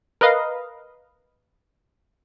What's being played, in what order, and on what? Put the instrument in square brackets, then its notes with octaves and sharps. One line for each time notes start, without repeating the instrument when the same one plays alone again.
[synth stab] A#4 B4 D#5 F5